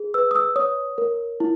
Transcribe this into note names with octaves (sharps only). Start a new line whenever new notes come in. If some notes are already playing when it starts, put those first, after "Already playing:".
Already playing: G#4
B4 E6
D#6
E6
C#5 D#6
A#4
E4